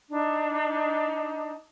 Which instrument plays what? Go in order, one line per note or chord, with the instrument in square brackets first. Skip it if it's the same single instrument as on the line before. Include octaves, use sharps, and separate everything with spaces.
[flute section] D4 D#4